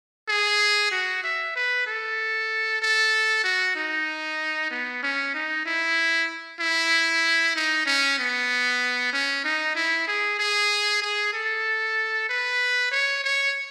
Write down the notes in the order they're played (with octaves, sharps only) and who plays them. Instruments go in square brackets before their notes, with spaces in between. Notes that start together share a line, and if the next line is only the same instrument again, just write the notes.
[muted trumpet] G#4
F#4
E5
B4
A4
A4
F#4
D#4
B3
C#4
D#4
E4
E4
D#4
C#4
B3
C#4
D#4
E4
G#4
G#4
G#4
A4
B4
C#5
C#5